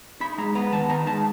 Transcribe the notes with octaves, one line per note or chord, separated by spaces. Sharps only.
D#4 B5
G#3 A#5
B3 A#5
D#3 A5
D#4 A#5
G#3 A5